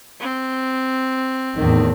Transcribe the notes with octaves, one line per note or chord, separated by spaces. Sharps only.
C4
E2 A2 D#3